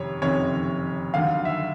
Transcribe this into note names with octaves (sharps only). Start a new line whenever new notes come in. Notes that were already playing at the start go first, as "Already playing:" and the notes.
Already playing: F#1 F2 C3 D#3 C#5
F#1 F2 C3 D#3 C#5
D#2 D3 F#3 F5
E5